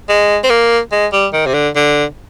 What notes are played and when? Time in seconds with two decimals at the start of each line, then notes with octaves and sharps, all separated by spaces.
0.09 G#3
0.44 C4
0.50 A#3
0.92 G#3
1.12 G3
1.33 D#3
1.46 C3
1.54 D3
1.75 D3